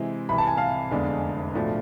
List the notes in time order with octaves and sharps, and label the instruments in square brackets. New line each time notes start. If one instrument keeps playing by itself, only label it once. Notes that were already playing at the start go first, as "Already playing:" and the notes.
Already playing: [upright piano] C3 E3 G#3 C4 E4
[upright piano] C2 C3 E3 [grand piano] B5
[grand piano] A5
G#5
F5 A5
[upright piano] F1 E2 D3 G#3 D4
B1 A2 F3 A3 D4